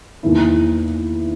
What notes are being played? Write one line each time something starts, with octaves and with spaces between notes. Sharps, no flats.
E2 D#3 A#3 E4